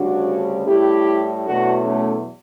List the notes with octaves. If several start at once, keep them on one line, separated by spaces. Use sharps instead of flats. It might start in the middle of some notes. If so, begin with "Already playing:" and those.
Already playing: D2 C#3 G3 D4 F#4
A2 G3 E4 G4
E2 B2 F#3 A3 D4 F#4
A3 C#4